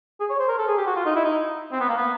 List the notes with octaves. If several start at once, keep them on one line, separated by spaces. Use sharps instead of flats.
G#4
C#5
C5
A#4
A4
G#4
G4
F#4
F4
D#4
E4
D#4
C4
B3
A#3
B3